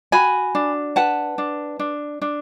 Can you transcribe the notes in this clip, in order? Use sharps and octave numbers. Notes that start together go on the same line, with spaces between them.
F#4 G#5 B5
D4
B4 F#5 A5
D4
D4
D4